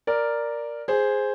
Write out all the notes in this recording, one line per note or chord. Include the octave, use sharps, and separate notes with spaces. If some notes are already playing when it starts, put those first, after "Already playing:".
A#4 D5
G#4 C5